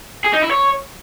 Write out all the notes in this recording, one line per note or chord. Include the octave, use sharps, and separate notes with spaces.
G#4
D#4
E4
C#5